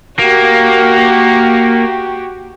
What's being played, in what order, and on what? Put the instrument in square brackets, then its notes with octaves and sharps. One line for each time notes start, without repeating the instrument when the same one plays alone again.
[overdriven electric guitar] A#3 [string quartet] F#4 G4